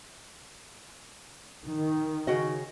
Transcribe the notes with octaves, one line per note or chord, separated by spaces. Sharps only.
D#3
C#3 F#4 D#5